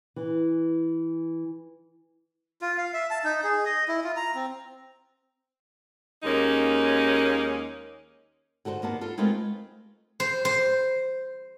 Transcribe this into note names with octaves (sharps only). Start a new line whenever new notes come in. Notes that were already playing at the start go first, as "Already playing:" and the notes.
E3
F4
F5
E5
A5
D#4
G#4
D#5
E4
F4
A#5
C4
D#2 G#3 A#3 C#4 D#4
D3 F#4 A4 B4 C5
D#2 A#3 B3 A5
F4 A4
G#3 A3 C4 F4 A#4 B4
C5
C5